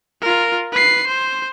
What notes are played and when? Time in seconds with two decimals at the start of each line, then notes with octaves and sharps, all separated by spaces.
0.21 F4 A#4
0.72 B4 C7
1.07 C5